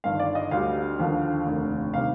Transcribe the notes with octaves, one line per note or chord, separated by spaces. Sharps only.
G1 G2 D#3 F5
D5
D#5
D2 D3 G3 F5
D#2 D3 F3
F1 D#2 D3
C3 D#3 G3 F5